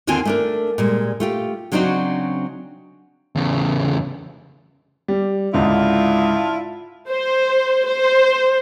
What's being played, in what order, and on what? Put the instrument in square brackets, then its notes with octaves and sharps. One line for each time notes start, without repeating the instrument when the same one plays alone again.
[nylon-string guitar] D#2 D3 C4 F4 G#5 A5
A3 D4 A#4
A#2 G3 G#3
A3 F4 G4
C#3 F#3 C4 D4 D#4 F#4
[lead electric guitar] E2 C#3
[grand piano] G3
[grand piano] C#2 G#2 D3 [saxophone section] D4 E4 F4
[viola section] C5
C5